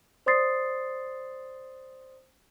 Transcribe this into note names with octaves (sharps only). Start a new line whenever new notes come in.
C5 D5 C6 D#6 A6 C7